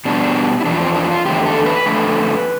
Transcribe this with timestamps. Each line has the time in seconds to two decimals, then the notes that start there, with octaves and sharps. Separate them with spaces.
0.05 B2 G3 D4
0.61 E4
0.65 E2 D3 F3 D4
0.80 C4
0.96 D4
1.11 F4
1.25 E2 D3 A3 G4
1.46 A4
1.66 B4
1.86 F2 D3 A3